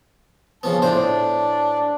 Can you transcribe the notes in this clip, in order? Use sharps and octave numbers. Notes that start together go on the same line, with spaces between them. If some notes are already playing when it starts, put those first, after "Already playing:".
C#3 F3 B3 A5
A2 D4 C5